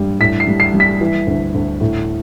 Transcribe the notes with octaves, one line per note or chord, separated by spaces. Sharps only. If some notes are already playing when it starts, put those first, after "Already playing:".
Already playing: G2 G3
A2 B6
C7
G3
C7
G3
B6
E3
D2
D2
A2